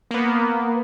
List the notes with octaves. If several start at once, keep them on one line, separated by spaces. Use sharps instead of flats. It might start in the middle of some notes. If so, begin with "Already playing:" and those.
A#3 B3